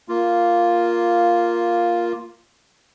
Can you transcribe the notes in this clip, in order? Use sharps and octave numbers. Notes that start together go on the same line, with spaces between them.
A#3 F4